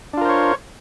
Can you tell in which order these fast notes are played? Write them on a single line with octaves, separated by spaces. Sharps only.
D4 F4 A#4 C5 C#5